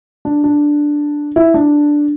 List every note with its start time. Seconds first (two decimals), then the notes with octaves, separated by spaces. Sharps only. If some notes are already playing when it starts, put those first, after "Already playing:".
0.25 D4
0.44 D4
1.36 E4
1.54 D4